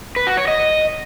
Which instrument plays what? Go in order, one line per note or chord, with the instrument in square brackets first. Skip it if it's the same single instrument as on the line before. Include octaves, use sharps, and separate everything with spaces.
[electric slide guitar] B4
F#4
C#5
D#5